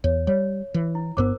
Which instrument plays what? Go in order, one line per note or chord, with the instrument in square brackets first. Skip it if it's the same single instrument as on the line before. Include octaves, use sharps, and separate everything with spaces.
[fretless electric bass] E2 [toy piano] C#5
[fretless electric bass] G3 [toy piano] C#5
[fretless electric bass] E3
[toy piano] E4
[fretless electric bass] G1 G2 B3 [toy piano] A#4 C5 D6